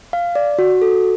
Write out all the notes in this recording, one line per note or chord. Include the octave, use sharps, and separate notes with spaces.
F5
D5
F#4
A4